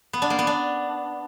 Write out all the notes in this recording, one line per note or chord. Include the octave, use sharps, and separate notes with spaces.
B3
D4
A#3
B3
D4